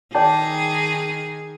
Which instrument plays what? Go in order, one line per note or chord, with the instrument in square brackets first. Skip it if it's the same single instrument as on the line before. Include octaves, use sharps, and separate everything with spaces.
[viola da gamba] D#3 G#4 [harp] D5 G5 A5